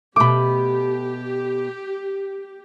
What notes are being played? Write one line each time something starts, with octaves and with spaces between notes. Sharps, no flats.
B2 A3 G4 B5 D6